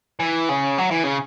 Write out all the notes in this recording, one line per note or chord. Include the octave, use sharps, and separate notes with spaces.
E3
C#3
F#3
E3
C#3